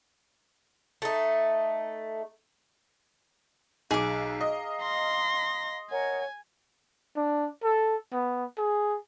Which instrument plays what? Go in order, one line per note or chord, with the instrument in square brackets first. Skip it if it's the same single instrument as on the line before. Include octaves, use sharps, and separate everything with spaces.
[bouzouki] A3 D#4
[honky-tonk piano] B1 [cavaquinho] G#4 D6 [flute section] F5 A#5
[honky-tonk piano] D#5
[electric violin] C6 A#6
[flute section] A#4 C#5 F#5 [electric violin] G#5
[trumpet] D4
A4
B3
G#4